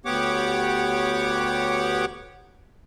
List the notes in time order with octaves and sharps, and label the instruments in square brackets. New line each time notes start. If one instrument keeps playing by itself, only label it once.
[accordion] D2 B3 G4 C#5 F#5 D6